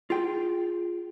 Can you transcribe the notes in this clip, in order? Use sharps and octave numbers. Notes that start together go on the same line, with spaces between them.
F4 G#4 G5